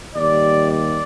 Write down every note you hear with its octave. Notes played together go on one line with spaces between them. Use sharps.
D#2 D#3 G3 D5
D5